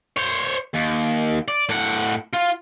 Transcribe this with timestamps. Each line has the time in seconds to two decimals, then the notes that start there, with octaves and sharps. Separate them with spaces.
0.17 C5 C#5
0.74 D#2
1.48 D5
1.69 A2 F#5
2.34 F4